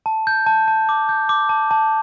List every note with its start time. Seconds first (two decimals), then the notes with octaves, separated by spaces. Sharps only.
0.06 A5
0.27 G6
0.47 A5
0.68 A5
0.89 D6
1.09 G6
1.29 D6
1.49 A5
1.71 A5